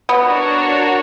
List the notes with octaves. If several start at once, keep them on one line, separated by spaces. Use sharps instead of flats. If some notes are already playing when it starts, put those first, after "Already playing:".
B3
D4 F#4 A#4 C#5